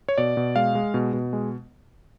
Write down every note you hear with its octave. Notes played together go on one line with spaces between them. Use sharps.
C#5
B2 D5
B2
G#3 F5
G#3
B2
B2
G#3